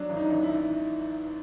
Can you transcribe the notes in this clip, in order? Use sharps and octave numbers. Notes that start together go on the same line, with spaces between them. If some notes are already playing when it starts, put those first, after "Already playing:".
Already playing: F#3 D4
A1
D#4
A1
E4
A1